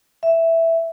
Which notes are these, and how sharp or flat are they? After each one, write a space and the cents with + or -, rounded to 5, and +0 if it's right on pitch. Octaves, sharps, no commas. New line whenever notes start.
E5 +0